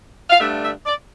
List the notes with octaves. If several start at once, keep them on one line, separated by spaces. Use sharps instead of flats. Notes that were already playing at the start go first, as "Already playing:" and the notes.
F5
G2 D3 A3 D4 E5
E5
D5